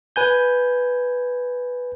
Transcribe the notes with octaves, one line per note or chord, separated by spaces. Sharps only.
B4 G#5 G6